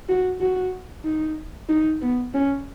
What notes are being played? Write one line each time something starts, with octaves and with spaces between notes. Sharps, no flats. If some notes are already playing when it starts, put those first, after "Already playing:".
F#4
F#4
D#4
D#4
B3
C#4